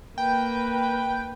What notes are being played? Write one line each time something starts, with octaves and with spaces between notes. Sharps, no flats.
A#3 B4 G5